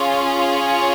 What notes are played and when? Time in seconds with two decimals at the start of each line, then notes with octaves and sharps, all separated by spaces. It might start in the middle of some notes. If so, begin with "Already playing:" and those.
Already playing: C#4 F4 G#4
0.55 C#5